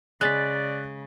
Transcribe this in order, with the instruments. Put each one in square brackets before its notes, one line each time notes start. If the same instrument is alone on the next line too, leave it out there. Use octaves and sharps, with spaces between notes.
[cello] C#3 [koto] G#3 [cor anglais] D5 [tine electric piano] F#6 A6 B6